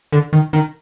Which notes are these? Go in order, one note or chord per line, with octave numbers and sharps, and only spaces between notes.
D3
D#3
D#3